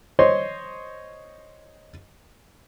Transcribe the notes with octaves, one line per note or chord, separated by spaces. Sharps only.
C5 C#5 D#5 C6